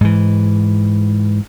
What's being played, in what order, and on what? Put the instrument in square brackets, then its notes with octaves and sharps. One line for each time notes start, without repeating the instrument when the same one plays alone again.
[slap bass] G#2 E3